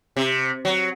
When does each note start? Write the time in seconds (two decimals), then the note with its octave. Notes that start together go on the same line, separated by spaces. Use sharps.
0.16 C3
0.65 F#3